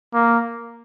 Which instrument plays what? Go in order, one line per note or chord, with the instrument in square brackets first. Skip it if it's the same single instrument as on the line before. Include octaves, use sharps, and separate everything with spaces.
[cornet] A#3